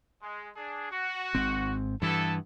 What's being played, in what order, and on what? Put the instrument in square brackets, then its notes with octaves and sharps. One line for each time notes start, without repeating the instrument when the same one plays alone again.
[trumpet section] G#3
D4 G#4
F#4
[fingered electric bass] G#1 G#2 C4
[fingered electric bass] G2 E3 [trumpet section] B3 E4 A4